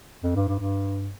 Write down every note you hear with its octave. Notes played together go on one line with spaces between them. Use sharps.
F2
G2
G2
G2